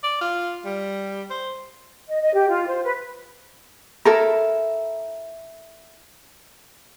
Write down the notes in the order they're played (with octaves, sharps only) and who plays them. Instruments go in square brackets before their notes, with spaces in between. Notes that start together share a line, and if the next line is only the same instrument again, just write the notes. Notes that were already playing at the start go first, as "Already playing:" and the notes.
[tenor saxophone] D5
F4
G3
C5
[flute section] D#5
D#5
G4
F4
C5
B4
[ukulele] E4 A4 A#4